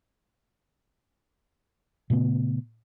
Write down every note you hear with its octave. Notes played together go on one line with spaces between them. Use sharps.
A#2 C#3 A3 B3